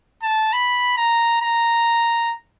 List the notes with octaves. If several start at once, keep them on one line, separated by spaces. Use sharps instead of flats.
A5
B5
A#5
A#5